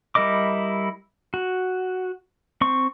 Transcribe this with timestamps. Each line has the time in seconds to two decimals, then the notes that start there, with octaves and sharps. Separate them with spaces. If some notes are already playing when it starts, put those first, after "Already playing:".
0.15 G3 E4 A#4 D#5 D6
1.34 F#4
2.61 C4 C#6